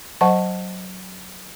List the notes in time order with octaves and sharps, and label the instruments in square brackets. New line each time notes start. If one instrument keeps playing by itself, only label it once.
[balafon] F#3 C5 D#5 F#5 A5 C#6